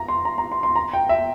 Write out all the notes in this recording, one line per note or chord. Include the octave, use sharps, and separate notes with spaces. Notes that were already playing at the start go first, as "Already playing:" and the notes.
Already playing: A#5
C6
A#5
A#5
C6
C6
A#5
G5
E5